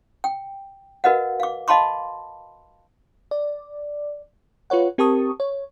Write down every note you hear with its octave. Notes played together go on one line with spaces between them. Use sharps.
G5
F#4 A#4 B4 D#5 F5 F#5
F5 D6
D#5 F5 A5 B5 C6 D6
D5
F4 B4 C#5 F#5
C4 G4 A#4 A5 C#6 D#6
C#5